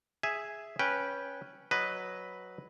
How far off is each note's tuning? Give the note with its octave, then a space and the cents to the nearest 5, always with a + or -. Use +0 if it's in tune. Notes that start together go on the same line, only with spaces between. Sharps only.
G#4 +0 E5 +0 G#5 +0
C#4 +0 B4 -15 G5 +0
F#3 +0 B4 +0 D#5 -5